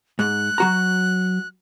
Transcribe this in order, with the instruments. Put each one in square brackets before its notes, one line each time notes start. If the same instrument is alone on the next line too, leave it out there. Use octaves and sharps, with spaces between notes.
[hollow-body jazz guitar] G#2 [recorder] F#6
[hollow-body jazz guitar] F#3 F#4 A#5